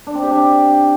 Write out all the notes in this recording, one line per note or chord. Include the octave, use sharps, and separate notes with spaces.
D4
C4
G4
D4